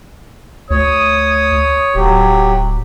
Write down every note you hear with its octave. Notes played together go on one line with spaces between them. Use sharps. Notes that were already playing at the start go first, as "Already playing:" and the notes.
D2 C#5 D#6
D1 F#3 G4